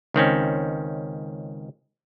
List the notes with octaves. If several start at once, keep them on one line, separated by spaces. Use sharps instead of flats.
C#2 D#3 C4 C#4